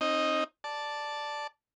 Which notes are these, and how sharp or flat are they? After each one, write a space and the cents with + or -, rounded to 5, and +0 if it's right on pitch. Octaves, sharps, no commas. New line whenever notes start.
C4 +40 D#4 +0 D#5 +0
D5 +0 A5 +0